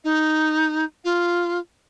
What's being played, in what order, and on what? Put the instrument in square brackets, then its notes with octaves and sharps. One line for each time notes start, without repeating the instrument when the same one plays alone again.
[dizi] D#4
F4